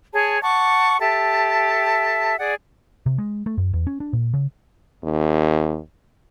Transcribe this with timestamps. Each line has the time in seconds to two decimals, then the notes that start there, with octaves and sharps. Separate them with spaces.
0.13 G#4 C#5 A5
0.43 F#5 A5 C#6 D6
0.99 G4 A4 E5 A5
2.39 G#4 D5 F#5
3.06 C3
3.18 G#3
3.46 A3
3.58 F#2
3.73 E2
3.87 C#4
4.00 D4
4.13 A#2
4.34 C#3
5.03 D#2